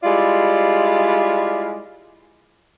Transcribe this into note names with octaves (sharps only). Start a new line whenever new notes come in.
G3 G#3 E4 F4 D5